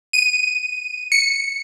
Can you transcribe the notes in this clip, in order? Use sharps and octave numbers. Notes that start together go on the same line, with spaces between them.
D#7
C#7